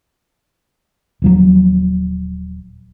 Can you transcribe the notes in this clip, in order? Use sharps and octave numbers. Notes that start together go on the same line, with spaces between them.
D#1 F3 F#3